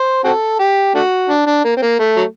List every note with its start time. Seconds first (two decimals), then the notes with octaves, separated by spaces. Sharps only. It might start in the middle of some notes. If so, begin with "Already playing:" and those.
Already playing: C5
0.24 C4 F#4 A4
0.59 G4
0.94 A3 D4 F#4
1.29 D4
1.47 D4
1.64 A#3
1.77 C4
1.82 A#3
1.99 A3
2.16 F#3